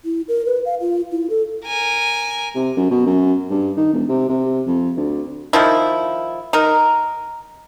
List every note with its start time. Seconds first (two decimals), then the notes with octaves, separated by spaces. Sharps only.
0.05 E4
0.28 A#4
0.46 B4
0.65 F5
0.81 F4
1.11 E4
1.30 A4
1.66 A#4 G#5
2.55 C3
2.77 F#2
2.91 B2
3.06 F#2
3.50 G2
3.77 D#3
3.93 E1
4.09 C3
4.29 C3
4.67 F2
4.97 D2
5.53 D#3 F3 E4
6.53 D#4 A#4